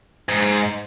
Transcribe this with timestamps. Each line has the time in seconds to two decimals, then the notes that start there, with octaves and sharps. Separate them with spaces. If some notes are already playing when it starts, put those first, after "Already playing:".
0.29 G#2